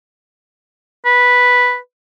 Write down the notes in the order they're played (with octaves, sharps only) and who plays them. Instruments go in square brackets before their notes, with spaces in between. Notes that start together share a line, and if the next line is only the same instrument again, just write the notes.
[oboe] B4